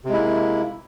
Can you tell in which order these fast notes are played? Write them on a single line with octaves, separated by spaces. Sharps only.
C3 G#3 E4 A#3